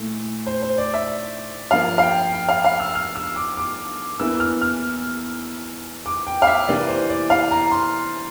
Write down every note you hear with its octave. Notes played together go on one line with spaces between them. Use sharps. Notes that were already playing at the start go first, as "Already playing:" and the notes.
Already playing: A#2 A3 E4
C5
C5
D5
E5
G2 F3 A#3 F5
F5
G5
G5
F5
F5
E6
F6
E6
D6
D6
E2 E3 A#3 E4 E6
F6
F6
D6
G5
F5
E5
C3 E3 A#3 E4 D5
C5
D5
F5
A#5
C6